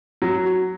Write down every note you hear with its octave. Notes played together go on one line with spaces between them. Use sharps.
F#3